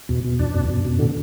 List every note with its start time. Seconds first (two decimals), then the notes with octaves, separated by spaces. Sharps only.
0.09 E2 B2
0.24 B2
0.39 E2 D4
0.54 F#2 B2
0.64 E2
0.70 F#2 B2
0.85 B2
0.90 F#2
0.99 A2 D3